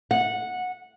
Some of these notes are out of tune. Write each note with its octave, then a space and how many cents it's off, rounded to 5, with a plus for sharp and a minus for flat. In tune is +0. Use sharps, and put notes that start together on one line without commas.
F#5 -15